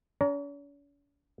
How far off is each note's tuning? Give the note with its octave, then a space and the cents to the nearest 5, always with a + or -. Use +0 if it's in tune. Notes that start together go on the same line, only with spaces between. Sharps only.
C#4 +45 C#5 +45 A#5 +0